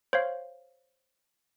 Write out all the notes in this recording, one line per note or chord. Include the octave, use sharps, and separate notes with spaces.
C5 C#5 F5